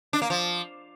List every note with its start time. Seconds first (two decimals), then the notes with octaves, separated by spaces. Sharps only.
0.13 D4
0.22 A#3
0.30 F3